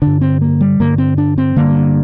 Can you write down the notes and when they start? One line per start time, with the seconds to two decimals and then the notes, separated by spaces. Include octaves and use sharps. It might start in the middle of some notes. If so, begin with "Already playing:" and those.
0.02 G2 D3 D4
0.21 C4
0.41 A#3
0.61 G3
0.80 G2 D3 A#3
0.98 C4
1.18 D4
1.38 C4
1.56 G2 D3 A#3